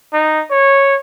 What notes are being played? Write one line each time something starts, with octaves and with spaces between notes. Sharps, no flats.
D#4
C#5